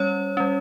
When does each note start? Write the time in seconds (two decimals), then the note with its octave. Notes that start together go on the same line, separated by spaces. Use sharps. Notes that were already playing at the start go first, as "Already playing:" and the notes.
Already playing: G3 C#4 C#5
0.37 G3 C#4